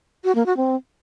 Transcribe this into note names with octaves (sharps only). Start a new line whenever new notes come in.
F#4
A#3
F#4
C4